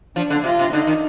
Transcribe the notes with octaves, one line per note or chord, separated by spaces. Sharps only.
F3 D4
D3
C3 F4
C3
D3 D#4
D#3